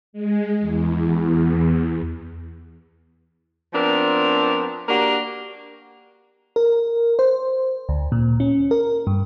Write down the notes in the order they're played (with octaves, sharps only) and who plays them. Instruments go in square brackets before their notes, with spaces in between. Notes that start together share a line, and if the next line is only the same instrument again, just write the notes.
[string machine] G#3
E2
[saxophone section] F3 B3 C4 D4 A#4
A#3 D4 F#4 G4 A#4
[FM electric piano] A#4
C5
D2
A#2
C#4
A#4
G2